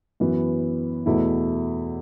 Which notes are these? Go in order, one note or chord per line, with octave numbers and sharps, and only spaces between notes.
F#2 E3 B3
E2 B2 A3 E4